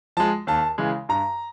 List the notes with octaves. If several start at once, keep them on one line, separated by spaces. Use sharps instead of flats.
F3 G#3 A5
D#2 A5
C#3 E3 G#3
G2 A#5